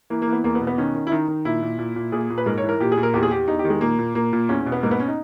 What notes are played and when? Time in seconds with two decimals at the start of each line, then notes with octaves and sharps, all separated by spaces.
0.10 E3 A#3
0.22 A#3
0.27 E3
0.33 B3
0.44 E2 A#3
0.55 B3
0.61 B2
0.67 B3
0.78 D#3 C#4
0.95 D#3
1.07 E4
1.12 D#3 D#4
1.28 D#3
1.45 A#2 E4
1.62 A#2
1.79 A#2
1.96 A#2
2.12 A#2 G#4
2.30 A#2
2.38 B4
2.46 G#2 A#4
2.58 C#5
2.63 E3
2.69 A#4
2.80 A#2 G4
2.92 G#4
2.97 A#2
3.03 A#4
3.14 E2 G4
3.23 G#4
3.31 E2 G4
3.48 E2 D#4
3.59 G4
3.65 D#3
3.70 G#3
3.81 A#2 A#3
3.99 A#2
4.15 A#2 A#3
4.33 A#2
4.49 E2 C#4
4.60 C#4
4.66 B2
4.72 B3
4.83 G#2 A#3
4.91 B3
5.00 C#4
5.08 D#4